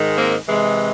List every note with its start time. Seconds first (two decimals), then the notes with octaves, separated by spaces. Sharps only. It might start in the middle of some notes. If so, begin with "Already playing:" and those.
Already playing: G#2 D#3 G#3
0.17 A#3 C4
0.47 C3 E3 G#3